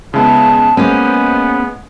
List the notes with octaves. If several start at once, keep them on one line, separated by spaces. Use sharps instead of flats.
C#3 G#3 B3 E4 A5
G#3 A#3 B3 C#4 C5